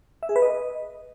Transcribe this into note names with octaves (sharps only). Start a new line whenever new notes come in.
E5
G#4
B4
D#5